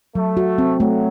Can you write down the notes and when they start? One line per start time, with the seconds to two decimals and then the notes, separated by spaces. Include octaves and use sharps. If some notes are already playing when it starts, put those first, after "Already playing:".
0.15 F#3 A3
0.37 F#4
0.58 C4
0.80 F#3 A3